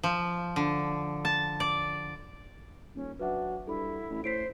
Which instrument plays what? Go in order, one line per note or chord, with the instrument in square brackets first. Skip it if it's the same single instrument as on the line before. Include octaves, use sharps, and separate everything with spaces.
[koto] F3
D3
A5
D5
[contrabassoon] D#1 [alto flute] C#4
[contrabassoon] F#3 [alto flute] D4 [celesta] B4 E5 F#5
[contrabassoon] G2 [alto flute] E4 [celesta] A4 B5
[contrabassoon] A1
[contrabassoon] A2 [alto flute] C5 [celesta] B6 C7 D7